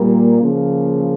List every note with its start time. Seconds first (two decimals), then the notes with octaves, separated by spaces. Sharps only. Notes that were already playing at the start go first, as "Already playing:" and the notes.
Already playing: A#2 G3 A#3
0.40 C#3 F3 A#3